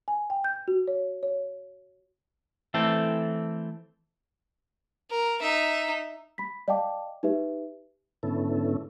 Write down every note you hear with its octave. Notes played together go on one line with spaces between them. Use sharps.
G#5
G5
G6
F#4
C#5
C#5
E3 A3 C4 A4
A#4
D#4 E5
B5 B6
D5 D#5 F5 G5 A5 D6
D#4 G4 B4 E5
G#2 D3 B3 C#4 E4 A4